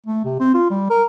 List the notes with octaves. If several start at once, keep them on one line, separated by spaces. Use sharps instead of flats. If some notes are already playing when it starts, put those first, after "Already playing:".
A3
C3
C4
F4
G3
A#4